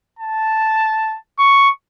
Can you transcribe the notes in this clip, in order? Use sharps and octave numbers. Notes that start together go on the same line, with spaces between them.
A5
C#6